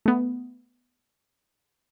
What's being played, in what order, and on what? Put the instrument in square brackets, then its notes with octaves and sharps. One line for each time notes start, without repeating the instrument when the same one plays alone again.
[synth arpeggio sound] A3 B3